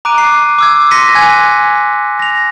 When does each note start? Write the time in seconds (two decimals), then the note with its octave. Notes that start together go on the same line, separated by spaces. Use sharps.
0.05 A#5 D6 F#6 D7 D#7
0.18 C7
0.59 D6 E6 G#6
0.91 C6 A#6 B6 C#7 D#7
1.15 G#5 F#6 G#6 B6
2.19 A#6 F7